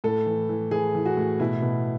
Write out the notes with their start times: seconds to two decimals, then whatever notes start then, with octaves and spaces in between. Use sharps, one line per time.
0.04 A2 A4
0.26 E3
0.49 E3
0.71 E3 G#4
0.95 E3
1.06 F#4
1.17 A2
1.40 B2 E4
1.62 B2